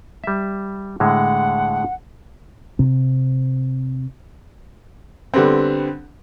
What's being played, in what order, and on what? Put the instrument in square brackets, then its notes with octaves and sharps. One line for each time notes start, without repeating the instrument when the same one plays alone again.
[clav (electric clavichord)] G3 E5
[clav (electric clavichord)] A2 D3 G#3 [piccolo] F#5
[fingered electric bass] C3 C4
[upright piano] D3 G3 B3 C4